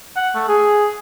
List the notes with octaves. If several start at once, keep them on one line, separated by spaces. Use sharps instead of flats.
F#5
A3
G#4